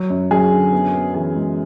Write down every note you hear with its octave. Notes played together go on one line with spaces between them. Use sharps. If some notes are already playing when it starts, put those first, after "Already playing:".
Already playing: F#3
F#2
F#2 G#4
D3
B3
B3
E3 G#4
G#3